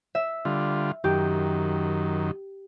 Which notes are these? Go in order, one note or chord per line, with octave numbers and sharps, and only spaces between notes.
E5
D3 G3 F4
F#2 D#3 G4